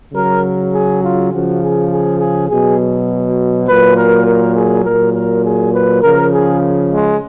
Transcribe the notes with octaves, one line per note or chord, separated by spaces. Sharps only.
C#3 F#3 A#4
G#4
F4
C#3 F3 F#4
G#4
G#4
G#4
B2 F#3 G#4
A#2 F#3 B4
A#4
A#4
G#4
A#2 F#3 A#4
A#4
G#4
B4
C#3 F3 A#4
G#4
G#3